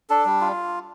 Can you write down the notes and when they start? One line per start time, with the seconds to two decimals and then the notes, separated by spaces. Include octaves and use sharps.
0.10 D4 A4
0.26 G3
0.41 F4